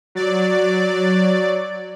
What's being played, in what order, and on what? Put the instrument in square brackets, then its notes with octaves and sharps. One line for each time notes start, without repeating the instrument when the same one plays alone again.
[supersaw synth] F#3 D5